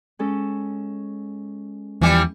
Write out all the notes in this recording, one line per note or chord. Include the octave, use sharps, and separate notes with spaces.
G#3 C#4 A4
E2 E3 F3 G3